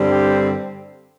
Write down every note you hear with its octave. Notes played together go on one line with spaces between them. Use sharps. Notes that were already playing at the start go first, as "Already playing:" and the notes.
Already playing: G2 D3 G3 C4
G4